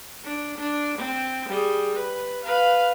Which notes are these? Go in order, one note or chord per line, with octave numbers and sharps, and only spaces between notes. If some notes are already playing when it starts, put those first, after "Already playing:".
D4
D4
C4
G3 G#4
B4
B4 F5